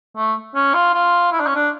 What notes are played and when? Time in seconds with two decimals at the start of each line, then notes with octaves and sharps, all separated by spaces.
0.17 A3
0.55 C#4
0.74 F4
0.94 F4
1.32 E4
1.40 D4
1.47 C#4
1.55 D4